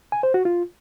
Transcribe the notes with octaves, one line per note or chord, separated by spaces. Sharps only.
G#5
C5
F#4
F4